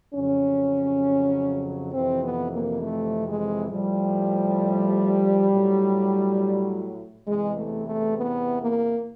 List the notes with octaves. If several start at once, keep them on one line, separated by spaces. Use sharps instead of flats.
F2 C#3 F#3 C#4
F2 C3 E3 C4
B3
A#3
A3
G#3
A2 F3 G3
A2 F#3
E2 C3 E3 G#3
A3
A3
B3
A#3